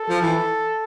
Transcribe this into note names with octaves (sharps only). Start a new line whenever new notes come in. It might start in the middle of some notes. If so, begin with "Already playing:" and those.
Already playing: A4
F3
E3